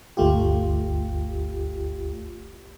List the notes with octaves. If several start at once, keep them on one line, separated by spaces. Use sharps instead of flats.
G1 D2 A3 F4 G4